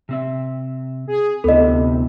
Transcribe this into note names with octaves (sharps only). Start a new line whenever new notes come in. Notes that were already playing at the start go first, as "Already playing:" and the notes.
C3 C4 E5
G#4
D2 C3 B3 E4 A4 D#5